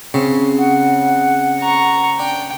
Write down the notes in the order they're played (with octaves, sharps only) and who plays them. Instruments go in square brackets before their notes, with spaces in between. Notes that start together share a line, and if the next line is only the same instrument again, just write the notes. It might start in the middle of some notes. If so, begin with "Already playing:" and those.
[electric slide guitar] C#3 [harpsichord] F#3 C4 C#6
[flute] F#5
[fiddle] A#5 C#6
[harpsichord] D4 [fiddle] G5